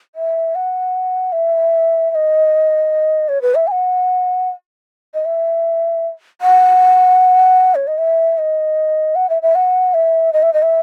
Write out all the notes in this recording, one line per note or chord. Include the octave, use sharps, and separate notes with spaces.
E5
F#5
E5
E5
D#5
C#5
B4
E5
G#5
F#5
D#5
E5
F#5
C#5
D#5
E5
D#5
F#5
E5
E5
F#5
E5
D#5
E5
D#5
E5